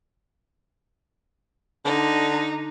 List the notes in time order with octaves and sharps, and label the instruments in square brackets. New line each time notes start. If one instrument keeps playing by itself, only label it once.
[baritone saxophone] D3 [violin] D#4